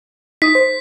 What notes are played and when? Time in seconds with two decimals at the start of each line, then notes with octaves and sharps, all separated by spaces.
0.42 D#4 D#6 B6
0.55 C5